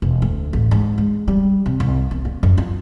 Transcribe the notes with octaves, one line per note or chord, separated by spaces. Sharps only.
E1
D2
A1
G#2
G#3
G3
C3
C2
B3
A#3
F#2
F4